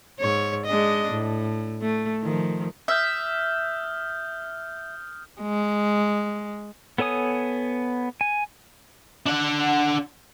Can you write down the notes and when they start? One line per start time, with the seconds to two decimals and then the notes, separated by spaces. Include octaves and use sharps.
0.20 G#2 C#5
0.66 G#3 D4 D#5
1.12 A2
1.82 A3
2.23 D#3 F3
2.88 E5 D#6 F6 G6
5.42 G#3
6.98 B3 A4 C#5 G#5 D#6
8.21 G#5
9.26 D4 F#5